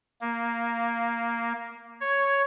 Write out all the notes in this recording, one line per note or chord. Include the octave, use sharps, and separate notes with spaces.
A#3
C#5